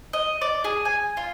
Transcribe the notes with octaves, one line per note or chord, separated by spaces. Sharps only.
D#5
D5
G#4
G#5
F4